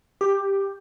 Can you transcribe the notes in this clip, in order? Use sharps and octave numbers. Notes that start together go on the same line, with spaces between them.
G4